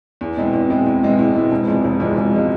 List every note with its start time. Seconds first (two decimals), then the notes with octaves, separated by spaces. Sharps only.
0.21 E2
0.37 B2 G#3 C4 E4
0.53 E2
0.69 B2 G#3 C4 E4
0.86 E2
1.03 B2 G#3 C4 E4
1.19 E2
1.35 B2 G#3 C4 E4
1.52 E1
1.67 E2 C3 F3 G#3
1.84 E1
2.00 E2 C3 F3 G#3
2.17 E1
2.34 C3 F3 G#3